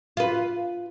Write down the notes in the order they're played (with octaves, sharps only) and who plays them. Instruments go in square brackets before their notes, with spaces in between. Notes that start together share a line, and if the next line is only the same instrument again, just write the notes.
[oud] F4 B4